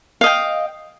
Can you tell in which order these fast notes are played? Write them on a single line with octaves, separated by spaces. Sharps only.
F5 D#5 G5